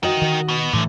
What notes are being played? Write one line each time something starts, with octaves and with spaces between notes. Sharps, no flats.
F#4 A#4 D#5 G5
D#3
B2 B3
F#2 A2 D3 E3